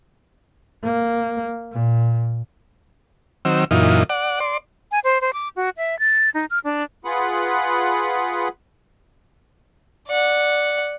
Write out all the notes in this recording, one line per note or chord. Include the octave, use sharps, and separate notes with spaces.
A#3
A#2
D#3 F#3 C4 E6
F#2 A#2 E3 D#4 F4
D5 F#5
D5 C6
G#5
C5
C5
D6
F#4
E5
A6
D#4
F6
D4
F4 G#4 B4 F#5 B5
D5 F#5